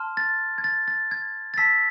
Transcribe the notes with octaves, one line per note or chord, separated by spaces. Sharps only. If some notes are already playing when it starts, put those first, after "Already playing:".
Already playing: A5 C6 F6
A6
G#6
A6
A6
G#6
A6
A5 E6 B6